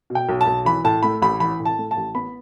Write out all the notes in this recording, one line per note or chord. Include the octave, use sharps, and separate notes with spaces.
B2
G5
B1
A5
B1
E3 B5
A2 A5
A3 B5
A1 B5
E3 B5
A2
A5
A3
A5
A1
B3 B5